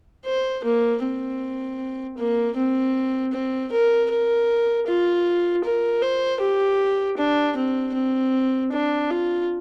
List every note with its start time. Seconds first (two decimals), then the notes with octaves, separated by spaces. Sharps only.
0.25 C5
0.64 A#3
1.02 C4
2.18 A#3
2.56 C4
3.32 C4
3.72 A#4
4.10 A#4
4.86 F4
5.64 A#4
6.02 C5
6.40 G4
7.17 D4
7.56 C4
7.94 C4
8.72 D4
9.10 F4